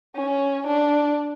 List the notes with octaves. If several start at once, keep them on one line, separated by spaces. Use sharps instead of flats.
C#4
D4